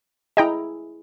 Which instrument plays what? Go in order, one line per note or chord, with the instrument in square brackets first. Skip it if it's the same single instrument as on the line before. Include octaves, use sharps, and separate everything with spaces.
[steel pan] E4 G#4 [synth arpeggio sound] D#5 G5 A#5